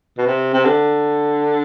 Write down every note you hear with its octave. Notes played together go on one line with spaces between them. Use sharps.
B2
C3
C3
D3